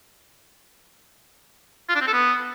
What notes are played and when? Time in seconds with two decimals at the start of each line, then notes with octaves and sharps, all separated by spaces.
1.89 F4
1.95 D4
2.01 C4
2.07 A4
2.13 B3